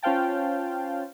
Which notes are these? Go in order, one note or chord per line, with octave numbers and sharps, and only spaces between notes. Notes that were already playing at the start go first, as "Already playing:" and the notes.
C#4 F4 C5 F5 G5 A5